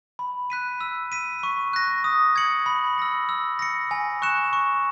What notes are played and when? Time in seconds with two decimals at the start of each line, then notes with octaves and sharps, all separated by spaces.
0.19 B5
0.50 F#6 B6 D#7
0.81 E6
1.12 B6 D#7
1.43 C#6
1.73 F#6 A#6
2.04 D#6
2.36 G#6 C#7 F#7
2.66 B5
2.98 E6 A#6 C#7
3.29 E6
3.59 A#6 C#7
3.91 G#5
4.22 C#6 F#6 C#7 E7
4.53 C#6